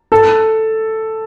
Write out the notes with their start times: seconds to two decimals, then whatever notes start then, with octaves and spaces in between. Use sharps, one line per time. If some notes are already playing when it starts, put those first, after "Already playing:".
0.12 A4